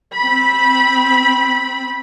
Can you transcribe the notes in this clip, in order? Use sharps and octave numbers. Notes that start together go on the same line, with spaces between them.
C4 B5